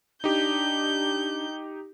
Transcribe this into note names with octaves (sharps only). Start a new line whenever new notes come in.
D4 D#4 G4 G6